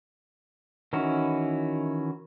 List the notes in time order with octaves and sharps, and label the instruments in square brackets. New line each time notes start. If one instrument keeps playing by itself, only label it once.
[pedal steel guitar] D#3 E3 C#4 E4 F#4